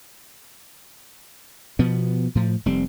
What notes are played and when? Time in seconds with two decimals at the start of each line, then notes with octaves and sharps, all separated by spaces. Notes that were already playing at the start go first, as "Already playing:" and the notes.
1.79 B2 F3 B3
2.35 A2 F3
2.66 F1 G3 C4